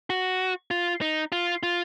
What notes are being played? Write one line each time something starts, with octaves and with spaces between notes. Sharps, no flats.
F#4
F4
D#4
F4
F4